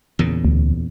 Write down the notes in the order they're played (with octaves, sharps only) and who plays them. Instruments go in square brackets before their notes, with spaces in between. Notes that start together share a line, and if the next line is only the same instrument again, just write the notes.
[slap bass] E2 A#2 C#3
[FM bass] D2